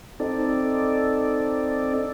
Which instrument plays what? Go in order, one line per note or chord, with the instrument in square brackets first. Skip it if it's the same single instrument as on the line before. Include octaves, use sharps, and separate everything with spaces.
[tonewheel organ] C4 D#4 A4 D5